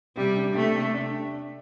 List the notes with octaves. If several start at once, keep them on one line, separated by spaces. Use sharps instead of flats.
C3 G3
D4
C3 A3
C3
D4